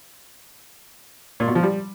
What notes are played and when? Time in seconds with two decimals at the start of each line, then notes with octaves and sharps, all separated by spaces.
1.40 A#2
1.48 B2
1.55 F3
1.63 G3